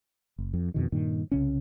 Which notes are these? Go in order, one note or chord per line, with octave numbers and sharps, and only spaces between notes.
F#1
F2
F2 B2 D#3
G2 A#2 D#3
C2 C#3 C#4